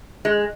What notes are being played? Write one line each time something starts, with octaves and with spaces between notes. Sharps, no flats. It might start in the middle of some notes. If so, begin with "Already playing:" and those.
G#3